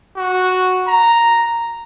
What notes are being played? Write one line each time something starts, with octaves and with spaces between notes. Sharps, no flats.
F#4
A#5